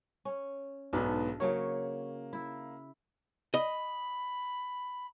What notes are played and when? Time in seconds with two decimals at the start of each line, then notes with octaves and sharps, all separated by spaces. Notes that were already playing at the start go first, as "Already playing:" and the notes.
0.25 C#4
0.93 B1 G#2 B3 D4
1.40 C#3 F#3 A#3 C#5
2.33 E4
3.54 D#5 B5